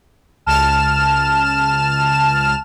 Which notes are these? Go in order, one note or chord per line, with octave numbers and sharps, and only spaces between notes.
C#2 A5 F6 E7